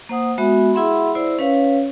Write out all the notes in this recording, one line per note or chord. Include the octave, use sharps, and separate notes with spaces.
A#3 C5 F#5 D#6
G#3 B3 F#4 E5 B5
E4 G#4 E5 F#5 B5 C6
E4 C5 D5
C#4 B4 C#5 F5